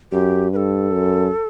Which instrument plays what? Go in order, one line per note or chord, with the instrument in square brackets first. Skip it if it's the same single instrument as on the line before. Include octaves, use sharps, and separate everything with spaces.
[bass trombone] F#2 [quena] G4
[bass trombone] G2 [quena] A4 B4
[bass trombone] F#2